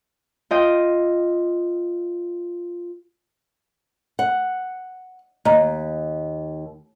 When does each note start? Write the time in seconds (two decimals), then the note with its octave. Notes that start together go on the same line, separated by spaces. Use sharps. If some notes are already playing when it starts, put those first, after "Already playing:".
0.51 F4 D#5 G5
4.19 F#5
5.45 D#2 D#5 A#5